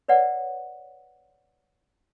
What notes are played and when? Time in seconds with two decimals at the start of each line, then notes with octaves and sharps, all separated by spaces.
0.08 B4 C#5 D5 F#5